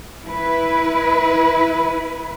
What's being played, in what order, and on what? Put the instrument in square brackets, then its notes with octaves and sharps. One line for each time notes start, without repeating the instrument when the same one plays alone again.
[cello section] E4 B4